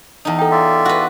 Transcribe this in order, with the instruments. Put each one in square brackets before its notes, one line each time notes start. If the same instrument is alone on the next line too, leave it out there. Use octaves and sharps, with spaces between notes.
[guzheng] E2 D#4
[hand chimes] A4 G5
[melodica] F4 D5 E5
[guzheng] F#4 B4